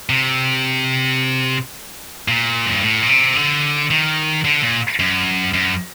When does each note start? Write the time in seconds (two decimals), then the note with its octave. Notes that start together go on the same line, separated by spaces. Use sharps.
0.09 C3
2.28 A#2
2.66 F#2
2.74 G2
2.82 A2
3.02 A#2
3.09 C3
3.36 D3
3.91 D#3
4.44 D3
4.63 A#2
5.00 F#2
5.54 F#2